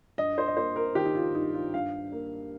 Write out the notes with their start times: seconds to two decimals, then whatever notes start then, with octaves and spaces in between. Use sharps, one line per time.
0.18 G2 D#5
0.38 C5
0.48 D#5
0.56 A#3 C5
0.76 A#4
0.95 D#3 G4
1.05 D#4
1.16 F4
1.34 G2 D#4
1.54 F4
1.74 G2 F5
2.12 A#3